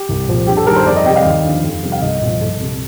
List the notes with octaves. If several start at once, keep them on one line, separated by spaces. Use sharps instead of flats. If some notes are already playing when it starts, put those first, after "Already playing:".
Already playing: G4
C2
A#2 F3
G2 G4
A4
D#3 G3 A#4
C5
F2 D5
D#5
C3 G3 G5
F5
D#2
D3 F3
F2
C3 G3
F5
C2 D#5
A#2 F3
C2 A4
C3 G3